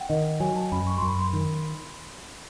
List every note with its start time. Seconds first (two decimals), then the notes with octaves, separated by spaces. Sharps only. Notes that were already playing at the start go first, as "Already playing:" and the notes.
Already playing: F#5 G5
0.09 D#3 D#5
0.40 F#3 G#5
0.56 A5
0.72 F#2 B5
0.87 C#6
0.98 F#2 C6
1.08 B5
1.19 C6
1.33 D#3